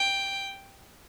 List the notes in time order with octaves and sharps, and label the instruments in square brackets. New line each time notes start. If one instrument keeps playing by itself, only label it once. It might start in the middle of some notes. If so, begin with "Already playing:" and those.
Already playing: [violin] G5